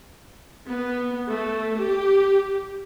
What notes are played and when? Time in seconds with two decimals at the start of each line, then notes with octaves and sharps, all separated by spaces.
0.68 B3
1.30 A3
1.81 G4